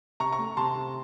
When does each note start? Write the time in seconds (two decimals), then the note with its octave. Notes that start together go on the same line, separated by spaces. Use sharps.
0.20 C3 A#5 C#6
0.32 A#5 C#6
0.38 A3
0.57 C3 A5 C6
0.75 C3